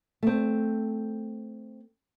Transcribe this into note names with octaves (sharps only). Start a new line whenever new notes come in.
A3 C4